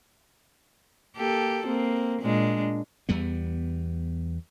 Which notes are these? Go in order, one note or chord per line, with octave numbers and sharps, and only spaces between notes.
A#3 G4 A4
A#3 C4
A#2 G#3 D4
E2 G3 B3